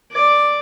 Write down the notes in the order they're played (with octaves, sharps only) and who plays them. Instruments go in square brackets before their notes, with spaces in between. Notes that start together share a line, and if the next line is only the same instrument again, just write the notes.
[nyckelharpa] D5